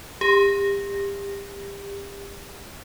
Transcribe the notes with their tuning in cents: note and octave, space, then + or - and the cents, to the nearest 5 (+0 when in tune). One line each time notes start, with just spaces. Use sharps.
G4 +30